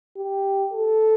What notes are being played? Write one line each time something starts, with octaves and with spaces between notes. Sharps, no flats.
G4
A4